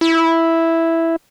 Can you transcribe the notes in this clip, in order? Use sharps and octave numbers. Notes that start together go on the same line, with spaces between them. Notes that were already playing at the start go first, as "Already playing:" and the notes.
E4